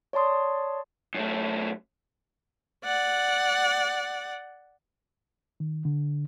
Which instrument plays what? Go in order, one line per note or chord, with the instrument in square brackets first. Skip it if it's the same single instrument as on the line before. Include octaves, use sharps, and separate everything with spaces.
[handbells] C#5 D5 A5 C6 D#6
[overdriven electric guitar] F#2 A3
[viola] D5 F#5
[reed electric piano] D#3
D3